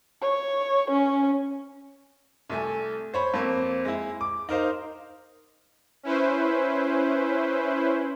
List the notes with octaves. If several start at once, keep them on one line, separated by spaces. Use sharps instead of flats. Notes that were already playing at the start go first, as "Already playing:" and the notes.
C#5
C#4
C2 A3 G#5
C5 C#5 B5
F2 A#3 C4
G#3 E4
D6
D#4 A#4 C5 F5
C#4 E4 B4 C5